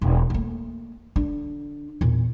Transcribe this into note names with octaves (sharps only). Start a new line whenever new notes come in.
E1
A3 A#3
D3 D4
E2 A#2